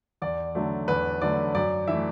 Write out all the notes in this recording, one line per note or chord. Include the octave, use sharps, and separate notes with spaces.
E2 D5
D3 F#3 A3
E2 B4
D3 F#3 A3 D5
F#2 D5
E3 A3 E5